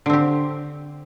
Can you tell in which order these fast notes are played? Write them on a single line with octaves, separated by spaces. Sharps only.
D3 C4 G4